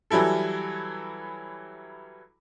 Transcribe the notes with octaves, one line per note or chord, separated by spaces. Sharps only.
E3 F#3 G3 E4 A4